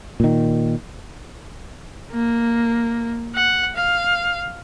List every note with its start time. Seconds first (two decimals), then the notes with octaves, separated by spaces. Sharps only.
0.20 A#2 D#3
2.12 A#3
3.35 F#5
3.76 F5